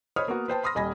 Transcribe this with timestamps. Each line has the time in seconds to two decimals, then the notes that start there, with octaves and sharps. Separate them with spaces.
0.16 C5 C#5 D#5 B5 D#6 F6
0.28 A#3 B3 F#4
0.48 B4 C5 G5 A5
0.63 B5 C6 D#6 F6 A#6
0.75 D#1 G3 D#5 G#5 B5 A#6